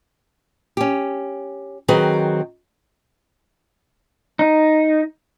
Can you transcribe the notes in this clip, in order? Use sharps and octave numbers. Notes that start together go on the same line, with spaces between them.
C#4 G4
D#3 F#3 C4 G#4 B4
D#4